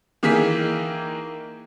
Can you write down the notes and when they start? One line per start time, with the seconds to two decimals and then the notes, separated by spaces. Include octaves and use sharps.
0.23 D#3 E3 A#3 G#4 B6